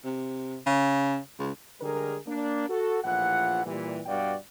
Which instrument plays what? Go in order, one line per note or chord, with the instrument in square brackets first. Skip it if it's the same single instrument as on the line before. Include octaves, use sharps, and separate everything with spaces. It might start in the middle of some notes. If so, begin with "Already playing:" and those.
[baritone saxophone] C3
C#3
C#2
[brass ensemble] D3 G3 G#3 G#4 A#4
A#3 D4
F#4 A4
A#1 A2 E3 F4 F#5
A#2 E3 G3
G2 B2 F#4 D5 F5 G5